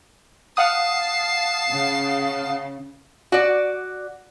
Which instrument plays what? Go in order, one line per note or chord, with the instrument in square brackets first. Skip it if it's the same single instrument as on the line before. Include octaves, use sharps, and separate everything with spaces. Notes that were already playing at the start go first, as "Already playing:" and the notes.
[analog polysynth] F5 F#5 D#6 [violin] A5 C7
[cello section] C#3
[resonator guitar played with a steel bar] F#4 D5